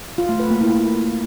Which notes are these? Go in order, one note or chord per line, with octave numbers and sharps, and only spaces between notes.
F4
A3
B4
A#3
E4